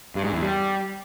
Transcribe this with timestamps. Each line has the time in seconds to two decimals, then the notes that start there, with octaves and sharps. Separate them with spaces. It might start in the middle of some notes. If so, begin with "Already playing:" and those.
0.15 G2
0.24 G#2
0.33 E2
0.42 G3